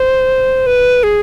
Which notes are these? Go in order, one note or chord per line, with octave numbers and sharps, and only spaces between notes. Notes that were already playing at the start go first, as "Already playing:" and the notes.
Already playing: C5
B4
G#4